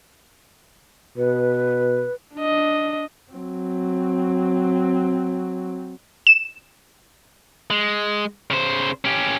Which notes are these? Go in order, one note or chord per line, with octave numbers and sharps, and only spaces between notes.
B2 B4
D4 D#5
F#3 C4
E7
G#3
C#3 C5
C#4 G4